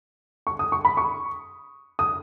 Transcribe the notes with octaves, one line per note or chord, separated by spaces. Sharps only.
C#6
D#6
C#6
B5
C#6
D#6